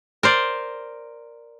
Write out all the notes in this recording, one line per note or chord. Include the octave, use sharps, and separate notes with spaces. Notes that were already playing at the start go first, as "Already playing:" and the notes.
A#4 C5 D5